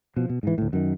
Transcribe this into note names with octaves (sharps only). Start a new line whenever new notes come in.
B2 F3
B2
G#2 E3
D2 A2
F#2 D#3